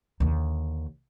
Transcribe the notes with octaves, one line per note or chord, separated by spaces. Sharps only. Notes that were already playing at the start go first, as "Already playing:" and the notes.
D#2 D3